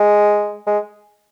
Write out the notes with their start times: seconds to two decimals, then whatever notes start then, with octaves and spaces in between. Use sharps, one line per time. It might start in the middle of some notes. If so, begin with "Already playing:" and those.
Already playing: G#3
0.66 G#3